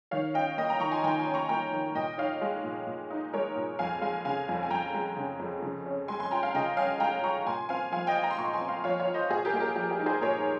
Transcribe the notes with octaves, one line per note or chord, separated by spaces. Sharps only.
D#3 C#5 F5
C#4 D#5 G5
A#3 D#5 G5
G5 A#5
D#3 A#5 C#6
G#5 C6
D#3 G5 A#5
G#5 C6
C#4
A#5 C#6
A#3 G5 A#5
D#3
A#2 D#5 G5
D#4 C#5 F5
G#3
A#2
A#2
D#4
G#3 A#4 C#5
A#2
F2 F5 G#5
G#3 F5 G#5
C#3 F5 G#5
F2
G#5
F2 G5 A#5
G#3
C#3
F2
C#3
C#4
G#3 G#5 C6
G#5 C6
F4 G5 A#5
F5 G#5
C#3 D#5 G5
C#4 F5 G#5
G#3 G5 A#5
F4 A#5 C#6
A#2 G#5 C6
C4 F5 G#5
F3 F5 G#5
D#5 G5
F4
G5 A#5
C6
A#2 A#5 C#6
G#5 C6
C4
F5 G#5
F3 C#5 F5
C#5 F5
F4
C5 D#5
A#2 G#4
G4 A#4
A#3 G#4
G4 A#4
F3 G#4
G#4
D#4
G#4 C5
A#2 A#4 C#5